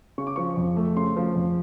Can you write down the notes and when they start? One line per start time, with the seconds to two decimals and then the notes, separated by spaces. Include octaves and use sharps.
0.18 C#3 C#6
0.27 D6
0.36 F3 C#6
0.57 F2
0.77 A3
0.97 C#3 C6
1.17 F3
1.36 F2